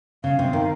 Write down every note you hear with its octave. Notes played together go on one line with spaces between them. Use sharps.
C#3 F5
C3
D#3